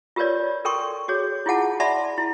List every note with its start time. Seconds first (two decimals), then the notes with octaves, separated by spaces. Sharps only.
0.16 F4 G4 A#4 B4 C#5 D5
0.65 A4 A#4 G5 C6 C#6
1.08 F#4 G#4 C#5
1.46 E4 F4 G#4 F#5 A5
1.80 D5 E5 F#5 A5 B5 C6
2.18 E4